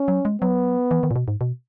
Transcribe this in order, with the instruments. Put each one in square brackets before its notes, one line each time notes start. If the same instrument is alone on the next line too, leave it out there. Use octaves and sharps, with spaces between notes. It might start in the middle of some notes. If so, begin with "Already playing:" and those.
Already playing: [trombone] C#4
[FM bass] F#3
G#3
[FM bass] F#3 [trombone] B3
[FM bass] E3
D#3
A#2
B2
G#2
B2